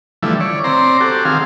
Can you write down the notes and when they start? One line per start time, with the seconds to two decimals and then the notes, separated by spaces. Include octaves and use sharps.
0.23 D3 E3 F3 G3 A3 E4
0.40 C#5 D5
0.64 C4 C5 D5 A#5
1.00 F#4 G4 A4
1.25 D#3 C4 G#4 F5